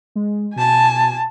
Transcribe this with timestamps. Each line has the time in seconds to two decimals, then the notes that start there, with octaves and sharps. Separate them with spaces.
0.15 G#3
0.56 B2 G#5 A5